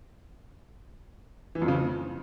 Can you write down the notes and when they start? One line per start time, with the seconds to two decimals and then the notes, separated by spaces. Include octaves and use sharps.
1.55 E3
1.62 F2
1.68 C#3
1.75 F2